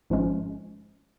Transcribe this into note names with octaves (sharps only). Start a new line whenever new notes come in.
G#1 G#2 F3 G#3 C#4